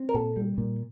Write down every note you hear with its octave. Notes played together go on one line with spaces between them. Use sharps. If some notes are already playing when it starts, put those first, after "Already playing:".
Already playing: C4
A#4
A#2 A4
G3
A#2